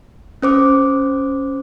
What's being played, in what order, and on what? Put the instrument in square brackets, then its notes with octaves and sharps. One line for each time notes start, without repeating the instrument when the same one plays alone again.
[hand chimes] C#4 C5 D6